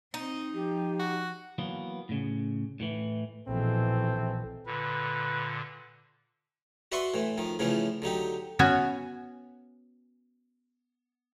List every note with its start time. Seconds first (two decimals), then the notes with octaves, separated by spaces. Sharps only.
0.14 C4 D#4
0.54 F3 G4
0.99 F#4
1.58 E3 F#3 A#3 B3
2.09 A2 C#3
2.80 A2 E3
3.48 A#1 B2 E3 C4 A4
4.66 A#2 D3 B4
6.92 F#4 B4 D5 E5 C6 C#6
7.14 A2 E3
7.38 D#3 F3
7.59 A2 C#3 E3 F3 A3 C#4
8.02 D3 F#3 D#4 G4
8.59 B3 C#4 F#4 C#5 G#5